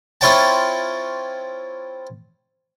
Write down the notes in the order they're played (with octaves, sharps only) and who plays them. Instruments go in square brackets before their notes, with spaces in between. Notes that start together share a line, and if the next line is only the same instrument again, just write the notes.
[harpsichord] C4 E4 F4 C#5 G5 A5